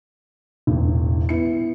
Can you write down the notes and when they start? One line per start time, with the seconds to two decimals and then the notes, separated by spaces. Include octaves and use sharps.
0.67 E1 A1
1.29 B3 E4 C#7